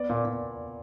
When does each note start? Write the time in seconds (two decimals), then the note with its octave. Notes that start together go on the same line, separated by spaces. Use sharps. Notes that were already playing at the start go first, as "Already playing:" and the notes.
Already playing: B3 D5
0.09 A#2
0.25 A#2